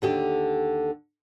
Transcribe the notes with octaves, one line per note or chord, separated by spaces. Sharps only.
D#2 D3 G4